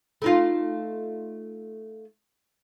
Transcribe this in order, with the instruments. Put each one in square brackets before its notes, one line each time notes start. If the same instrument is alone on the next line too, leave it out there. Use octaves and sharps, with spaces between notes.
[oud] A3 D#4 F4